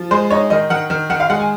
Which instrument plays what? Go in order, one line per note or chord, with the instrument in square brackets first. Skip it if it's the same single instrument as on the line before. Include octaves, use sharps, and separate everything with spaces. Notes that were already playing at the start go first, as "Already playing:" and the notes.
Already playing: [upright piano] F3
G#3 C5
D#4 C#5
D#3 D#5
D#3 F#5
D#3
D#3 F#5
F5
G#3 F#5
G#5